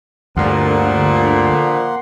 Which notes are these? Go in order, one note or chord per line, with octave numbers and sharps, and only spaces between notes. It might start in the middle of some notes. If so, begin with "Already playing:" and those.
D2 G2 A#2 D3 F3 A#3 F#5 C6